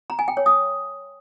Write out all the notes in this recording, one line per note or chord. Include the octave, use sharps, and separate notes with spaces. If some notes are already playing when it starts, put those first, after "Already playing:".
A#5
G#5
G5
C#5
D#6